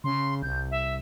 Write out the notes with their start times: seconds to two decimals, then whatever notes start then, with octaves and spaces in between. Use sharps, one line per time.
0.04 C#3 C6
0.43 C2 G6
0.71 E5